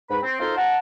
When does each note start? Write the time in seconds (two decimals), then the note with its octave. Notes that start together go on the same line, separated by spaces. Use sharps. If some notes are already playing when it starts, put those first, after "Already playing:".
0.10 G#2 B4 B5
0.23 C4
0.39 D#4 F4 F#4 A4 A#4 C5
0.57 F#5 A5 A#5